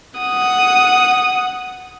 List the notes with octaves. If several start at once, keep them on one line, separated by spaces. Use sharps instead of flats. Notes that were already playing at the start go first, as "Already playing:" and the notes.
F#5 D#6